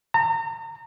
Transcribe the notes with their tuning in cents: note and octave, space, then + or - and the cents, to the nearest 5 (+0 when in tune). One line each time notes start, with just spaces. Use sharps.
A#5 -35